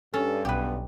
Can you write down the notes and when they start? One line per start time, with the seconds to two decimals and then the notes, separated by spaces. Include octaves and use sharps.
0.14 G2 C#4 A4
0.45 B1 B3 G4 B4